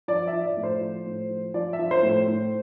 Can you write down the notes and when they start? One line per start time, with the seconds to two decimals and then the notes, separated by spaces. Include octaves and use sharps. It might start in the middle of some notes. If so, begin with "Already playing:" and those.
0.08 F3 D5
0.28 E5
0.33 F3
0.46 D5
0.57 A2
0.63 C5
0.81 F3
1.06 A2
1.30 F3
1.54 F3 D5
1.73 E5
1.79 F3
1.91 C5
2.03 A2
2.10 C5
2.27 A2